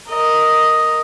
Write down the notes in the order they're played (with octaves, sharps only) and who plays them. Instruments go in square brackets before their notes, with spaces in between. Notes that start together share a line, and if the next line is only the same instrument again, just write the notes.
[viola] A#4 D#5